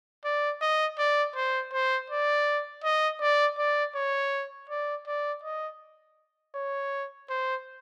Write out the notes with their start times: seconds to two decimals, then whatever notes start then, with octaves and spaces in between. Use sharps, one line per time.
0.24 D5
0.61 D#5
0.98 D5
1.35 C5
1.73 C5
2.10 D5
2.84 D#5
3.21 D5
3.58 D5
3.95 C#5
4.69 D5
5.07 D5
5.44 D#5
6.55 C#5
7.29 C5